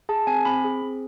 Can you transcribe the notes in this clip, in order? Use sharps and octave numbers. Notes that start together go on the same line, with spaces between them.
G#4 A5
C4 G#5
C4 B5
G#4
C4